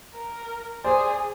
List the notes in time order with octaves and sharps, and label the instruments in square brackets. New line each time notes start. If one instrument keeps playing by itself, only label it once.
[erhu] A#4
[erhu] G#4 [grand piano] C5 D5